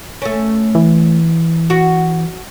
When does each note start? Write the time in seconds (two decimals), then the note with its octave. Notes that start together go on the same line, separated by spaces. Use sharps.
0.22 A3 C#4
0.75 E3
1.70 F#4